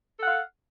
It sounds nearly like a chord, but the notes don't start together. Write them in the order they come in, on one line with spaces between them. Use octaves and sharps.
A4 F#5 F5